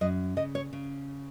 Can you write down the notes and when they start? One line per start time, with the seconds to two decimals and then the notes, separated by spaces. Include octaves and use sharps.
0.01 F#2 D#5
0.37 C#3 D#5
0.55 C#5
0.73 C#3